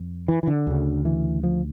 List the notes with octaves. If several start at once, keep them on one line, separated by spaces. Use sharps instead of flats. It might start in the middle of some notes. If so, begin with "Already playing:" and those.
Already playing: F2
E3
E3
D3
D2 C#3
E3
F3